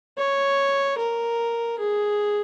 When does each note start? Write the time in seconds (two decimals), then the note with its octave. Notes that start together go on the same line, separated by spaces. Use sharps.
0.18 C#5
0.98 A#4
1.79 G#4